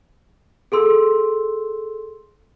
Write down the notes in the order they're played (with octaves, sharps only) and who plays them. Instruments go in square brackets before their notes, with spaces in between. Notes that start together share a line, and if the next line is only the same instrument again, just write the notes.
[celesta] G#4 A4 C6 E6